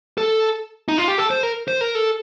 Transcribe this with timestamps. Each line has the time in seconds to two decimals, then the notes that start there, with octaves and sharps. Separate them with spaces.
0.18 A4
0.88 D#4
0.98 F4
1.08 G4
1.18 A4
1.31 C5
1.43 A#4
1.68 C5
1.81 A#4
1.95 A4